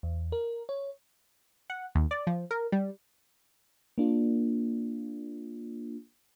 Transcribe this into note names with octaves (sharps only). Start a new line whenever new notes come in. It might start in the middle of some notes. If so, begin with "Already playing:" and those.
E2
A#4
C#5
F#5
D#2
D5
F3
A#4
G3
A#3 D4 F4